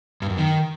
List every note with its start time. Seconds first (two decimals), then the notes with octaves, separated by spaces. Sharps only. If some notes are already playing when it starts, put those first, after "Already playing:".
0.22 G2
0.30 F#2
0.38 D#3